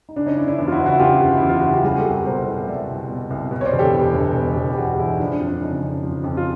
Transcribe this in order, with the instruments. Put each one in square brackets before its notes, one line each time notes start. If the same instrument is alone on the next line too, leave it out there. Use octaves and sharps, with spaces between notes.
[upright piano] D#4
C#3 D4
C#4 D#4
F#1 D4 E4
D4 E4
E2
F4
E4 F#4
F#1
E4 F#4
C#3 F4 G4
F#1
E2 E4
F4
F#1 F#4
G4
G3 F#4 G#4
G4 A4
C2
G#4 A#4
B2 A#4 C5
C2
G3 D5 E5
C2
B2
C2
B2
C#5
C5 D5
E1
G4 A4
E2
E1
B2
E1
G4
E2 F#4 G#4
E1 E4
D#4
F3 D4
D4
F2
D4
C#3 C#4 D#4
F2
F3
F2
F4